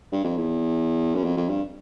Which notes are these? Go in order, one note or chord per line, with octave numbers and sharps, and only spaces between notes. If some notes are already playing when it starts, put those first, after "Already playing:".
G2
F2
E2
F#2
F2
F2
G2